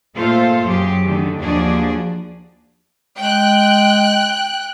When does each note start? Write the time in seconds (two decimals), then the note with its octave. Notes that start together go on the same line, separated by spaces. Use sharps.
0.15 A#2 A3 F4 A4 C5 F5
0.66 F#2 F#3 G4 G#4
1.05 D3 D#3 A3
1.41 D#2 F3 D4 F#4 G#4 D5
3.18 G#3 G5 F#6